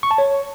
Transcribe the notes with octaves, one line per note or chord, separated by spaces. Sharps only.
C#6
A5
C#5